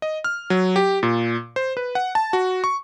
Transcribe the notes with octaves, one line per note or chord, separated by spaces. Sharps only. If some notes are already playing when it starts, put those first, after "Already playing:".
D#5
F6
F#3
G4
A#2
C5
B4
F#5
A5
F#4
C#6